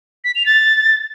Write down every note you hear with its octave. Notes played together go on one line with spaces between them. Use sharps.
B6
F7
A6